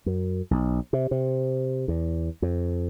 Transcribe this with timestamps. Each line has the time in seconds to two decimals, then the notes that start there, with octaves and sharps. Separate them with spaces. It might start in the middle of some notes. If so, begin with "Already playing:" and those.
0.06 F#2
0.51 B1
0.93 C3
1.11 C3
1.88 E2
2.42 F2